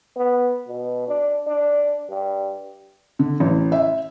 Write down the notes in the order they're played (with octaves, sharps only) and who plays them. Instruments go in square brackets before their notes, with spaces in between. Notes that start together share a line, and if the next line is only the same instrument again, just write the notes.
[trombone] B3
B2
D4
D4
G2
[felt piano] D3
A1
E5